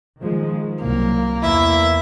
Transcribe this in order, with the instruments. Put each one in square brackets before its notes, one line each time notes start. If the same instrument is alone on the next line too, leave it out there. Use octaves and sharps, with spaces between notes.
[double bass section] D#3 F3 G#3
[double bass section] C2 F#3 [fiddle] A#3
[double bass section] E2 [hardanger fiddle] E4 E5